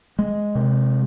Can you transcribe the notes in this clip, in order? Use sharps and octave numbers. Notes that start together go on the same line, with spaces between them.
G#3
C3